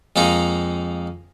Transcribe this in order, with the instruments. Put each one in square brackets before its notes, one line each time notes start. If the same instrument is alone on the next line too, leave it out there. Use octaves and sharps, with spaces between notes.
[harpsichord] F2 G#3 A#3 D#4 A#5